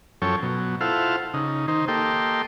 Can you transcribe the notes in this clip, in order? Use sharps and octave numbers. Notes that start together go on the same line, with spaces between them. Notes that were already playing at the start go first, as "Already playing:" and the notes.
F#2 F3 C#4 A4 C#5 G5
B2 F#3
E4 F4 A4 C5 F5 F#5
C#3 D#4
D#3 D#4 C5
A#3 G4 A4 D#5 G5 C6